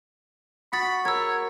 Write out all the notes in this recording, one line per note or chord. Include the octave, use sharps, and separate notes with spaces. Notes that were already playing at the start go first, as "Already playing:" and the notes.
F#4 F#5 B5 D#6 A6
A#4 C#5 E6 G#6